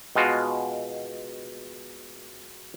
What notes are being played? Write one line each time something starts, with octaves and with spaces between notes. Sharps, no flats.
B2 G#3 F4 F#4